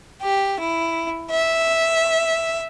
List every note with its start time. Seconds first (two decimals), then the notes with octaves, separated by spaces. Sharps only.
0.22 G4
0.60 E4
1.31 E5